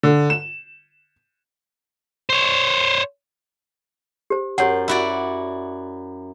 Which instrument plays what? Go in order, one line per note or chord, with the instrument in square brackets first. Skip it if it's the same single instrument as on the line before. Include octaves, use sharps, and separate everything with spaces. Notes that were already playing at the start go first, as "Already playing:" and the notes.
[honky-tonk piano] D3
E7
[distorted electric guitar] C5 C#5
[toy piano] G4 C5
[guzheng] F#2 [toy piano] G4 C#5 F#5
[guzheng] E4 F#4 D5